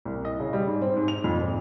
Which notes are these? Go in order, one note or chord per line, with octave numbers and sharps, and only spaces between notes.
C2
D#5
C#3
G3
G#2
C4
G#2
F7
F2
G#1